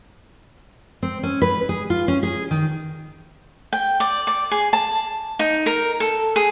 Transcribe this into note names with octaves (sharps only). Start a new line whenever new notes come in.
C4
C#4
B4
G#4
F4
C#4
G#4
D#3
G5
D5
D5
G#4
A5
D#4
A#4
A4
G#4